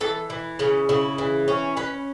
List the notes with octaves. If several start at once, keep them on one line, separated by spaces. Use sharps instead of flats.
E3 A4
E3
C#3 C#4
C#3 E4
E3
C#4
C#4 B4